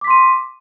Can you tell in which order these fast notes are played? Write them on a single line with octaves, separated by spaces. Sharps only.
D6 B6 C6 D#7